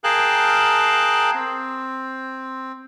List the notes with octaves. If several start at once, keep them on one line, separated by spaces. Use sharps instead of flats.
G#4 A#4 F5 G5 A5 F#6
C4